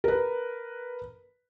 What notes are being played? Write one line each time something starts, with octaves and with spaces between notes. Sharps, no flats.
A#4 B4